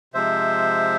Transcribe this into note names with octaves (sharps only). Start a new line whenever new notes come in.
C3 F3 G#3 C5 E5